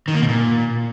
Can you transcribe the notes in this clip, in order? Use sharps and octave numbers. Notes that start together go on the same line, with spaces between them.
D#3
A#3
B2
A#2